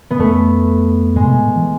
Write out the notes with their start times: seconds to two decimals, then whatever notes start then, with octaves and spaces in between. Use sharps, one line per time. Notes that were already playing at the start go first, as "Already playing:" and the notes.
0.11 B3
0.19 F2 A3
1.16 G#2 G#3
1.24 C3
1.32 B2
1.40 A2
1.56 E3